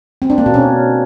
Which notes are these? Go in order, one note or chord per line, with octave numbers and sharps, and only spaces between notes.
C4
D4
A#3
B2
C#4